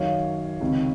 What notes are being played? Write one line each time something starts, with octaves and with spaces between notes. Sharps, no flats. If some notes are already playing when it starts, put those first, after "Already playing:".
Already playing: F#2 D#3 F#3 C#5 F5
C#2 C3 D#3